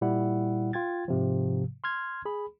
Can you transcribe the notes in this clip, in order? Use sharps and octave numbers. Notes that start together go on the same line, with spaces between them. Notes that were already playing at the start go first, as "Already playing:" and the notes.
A#2 G3 E4 F#5
F4 G5 G#6 A6
G#2 C3 F3
C6 F6 G#6
G#4 B5